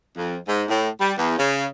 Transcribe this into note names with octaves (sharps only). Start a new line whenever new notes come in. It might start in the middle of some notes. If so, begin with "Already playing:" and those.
F2
G#2
A2
G3
E2
C#3